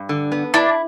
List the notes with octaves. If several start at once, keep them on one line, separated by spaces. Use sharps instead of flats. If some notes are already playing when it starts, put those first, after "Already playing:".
Already playing: G2
D3
B3
D4 E4